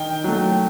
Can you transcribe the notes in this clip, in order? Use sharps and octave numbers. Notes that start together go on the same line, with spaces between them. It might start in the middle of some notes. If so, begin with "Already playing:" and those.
Already playing: D#3 G5
F#3 A3